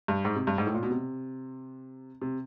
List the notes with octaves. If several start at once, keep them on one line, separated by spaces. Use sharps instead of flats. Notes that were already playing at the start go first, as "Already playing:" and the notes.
G2
G#2
C3
G2
G#2
A2
A#2
B2
C3
C3